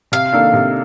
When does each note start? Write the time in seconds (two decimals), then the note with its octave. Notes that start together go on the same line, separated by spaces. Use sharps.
0.12 C3 F5
0.33 D#3 A#3 D4 A4
0.53 C3